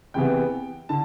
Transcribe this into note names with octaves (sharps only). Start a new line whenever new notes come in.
E2 C3 E3 B3 G5
D3 A5